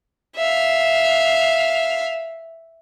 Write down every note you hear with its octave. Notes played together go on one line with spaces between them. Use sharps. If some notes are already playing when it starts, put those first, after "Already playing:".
E5 F5